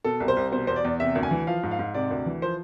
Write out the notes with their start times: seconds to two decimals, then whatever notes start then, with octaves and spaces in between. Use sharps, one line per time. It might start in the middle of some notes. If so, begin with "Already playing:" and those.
0.04 B2 A4
0.20 C2
0.28 C5
0.37 C2
0.52 B2 C5
0.67 E2 C5
0.76 D5
0.85 E2
1.00 C3 E5
1.15 D2
1.23 G#5
1.31 E3
1.47 F3 F5
1.63 G#2
1.71 F5
1.79 G#2
1.94 C3 D5
2.11 D2
2.26 E3
2.42 F3 C5